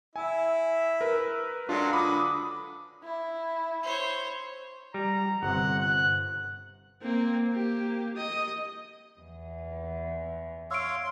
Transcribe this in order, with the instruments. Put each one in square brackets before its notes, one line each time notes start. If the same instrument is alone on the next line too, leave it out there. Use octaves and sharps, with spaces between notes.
[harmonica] E4 E5 [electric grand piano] G#5
[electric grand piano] A#4 B4
[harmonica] F#3 G#3 A4 [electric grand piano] D4 F4
[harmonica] D3 D6 [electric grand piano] B5 D#6
[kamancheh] E4
[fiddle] C5 C#5
[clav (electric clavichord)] G3 [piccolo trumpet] A#5
[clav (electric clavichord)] G1 C3 [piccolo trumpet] F#5
[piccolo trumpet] F#6
[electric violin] A#3 C4
A#3 G4
D#5 D#6
[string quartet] E2
[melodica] C#5 F5 [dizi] C6 [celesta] E6 D7